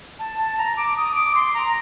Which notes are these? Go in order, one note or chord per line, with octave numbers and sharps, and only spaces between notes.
A5
A5
A#5
D6
D#6
D6
C6
A#5